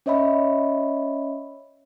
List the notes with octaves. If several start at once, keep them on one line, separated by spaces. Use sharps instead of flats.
C#4 C#5 D#5 E5 B5